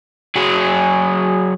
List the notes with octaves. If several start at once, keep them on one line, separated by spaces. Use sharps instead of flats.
F#3 G#4